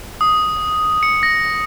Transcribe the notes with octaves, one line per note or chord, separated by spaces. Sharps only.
D#6
C#7
A#6